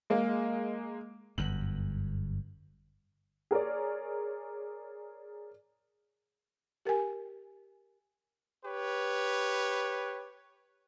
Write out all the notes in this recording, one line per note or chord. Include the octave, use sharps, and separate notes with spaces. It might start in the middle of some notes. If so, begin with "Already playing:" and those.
G#3 A#3
G1 F#2 F#7
G#4 A#4 C#5 D5
G4 A#4 G5 G#5
G4 B4 C#5